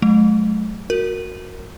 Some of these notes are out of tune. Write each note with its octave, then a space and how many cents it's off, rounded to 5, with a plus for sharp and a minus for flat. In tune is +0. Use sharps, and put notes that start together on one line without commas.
F#3 +0 A3 -40
F#4 -10 A#4 -10